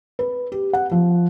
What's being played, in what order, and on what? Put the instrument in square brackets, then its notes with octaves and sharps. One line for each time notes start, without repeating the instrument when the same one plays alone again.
[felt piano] B4
G4
F#5
F3